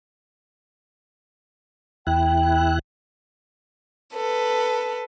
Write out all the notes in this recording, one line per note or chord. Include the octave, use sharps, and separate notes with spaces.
E2 E4 G5 F#6
A4 B4